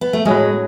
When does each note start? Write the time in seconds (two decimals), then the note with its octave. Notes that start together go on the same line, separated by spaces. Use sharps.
0.01 B3
0.13 A3
0.25 A2 F#3 G#3 C#4 G#4